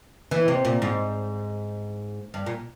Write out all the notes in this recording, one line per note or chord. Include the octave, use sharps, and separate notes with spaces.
E3
C3
A#2
G#2
G2
A#2